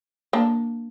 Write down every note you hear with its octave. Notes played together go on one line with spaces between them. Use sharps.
A#3 D4